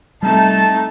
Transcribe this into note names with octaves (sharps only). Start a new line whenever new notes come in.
G3 A3 C4 D#4 A5